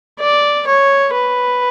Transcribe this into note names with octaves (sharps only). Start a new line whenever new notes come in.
D5
C#5
B4